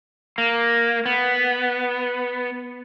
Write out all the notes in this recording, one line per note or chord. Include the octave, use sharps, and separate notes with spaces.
A#3
B3